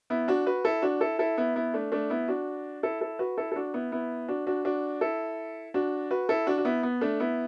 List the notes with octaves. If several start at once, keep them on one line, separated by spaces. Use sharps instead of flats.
B3 E4
D4 F#4
F#4 B4
E4 A4
D4 F#4
E4 A4
E4 A4
B3 E4
B3 E4
A3 D4
A3 D4
B3 E4
D4 F#4
E4 A4
E4 A4
F#4 B4
E4 A4
A4
D4 F#4
B3 E4
B3 E4
D4 F#4
D4 F#4
D4 F#4
E4 A4
D4 F#4
F#4 B4
E4 A4
D4 F#4
F#4
B3 E4
B3
A3 D4
B3 E4